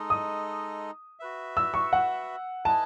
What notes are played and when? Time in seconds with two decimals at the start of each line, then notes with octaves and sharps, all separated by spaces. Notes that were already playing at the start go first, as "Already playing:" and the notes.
Already playing: G#3 D#4 A4 D#5
0.10 D#6
1.20 F#4 B4 E5
1.57 E6
1.74 C#6
1.93 F#5
2.65 E4 B4 D#5 G#5 A5